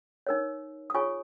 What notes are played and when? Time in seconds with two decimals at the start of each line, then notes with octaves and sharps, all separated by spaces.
0.27 D#4 A#4 C#5
0.90 D#6
0.94 F4 G#4 C#5 G#5 C#6